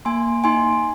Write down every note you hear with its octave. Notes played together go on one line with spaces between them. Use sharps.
A#3 G#5 C6
D#4 G#5 C6